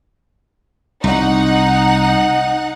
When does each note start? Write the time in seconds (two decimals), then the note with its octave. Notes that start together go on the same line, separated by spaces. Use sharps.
1.04 C2 D#4 F#5